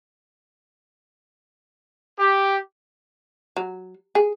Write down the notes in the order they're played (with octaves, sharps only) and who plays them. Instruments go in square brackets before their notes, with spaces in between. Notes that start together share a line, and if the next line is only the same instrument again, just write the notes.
[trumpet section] G4
[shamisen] F#3
G#4